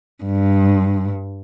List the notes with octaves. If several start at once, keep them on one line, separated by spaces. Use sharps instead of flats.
G2